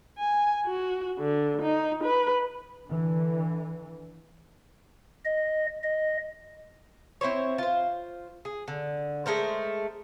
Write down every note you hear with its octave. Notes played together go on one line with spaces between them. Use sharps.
G#5
F#4
D3
D#4
B4
D3 E3
D#5
D#5
C4 E4 C5 C#5
F4 C5
G#4
D3
G#3 A3 A#4 C5